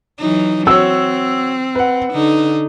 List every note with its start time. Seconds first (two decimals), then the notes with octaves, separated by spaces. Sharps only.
0.19 E3 F#3 D#4
0.67 C4 F#4 C#5 E6
1.75 B4 F#5
2.13 D3 D#4